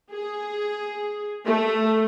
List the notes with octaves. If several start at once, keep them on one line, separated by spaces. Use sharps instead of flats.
G#4
A3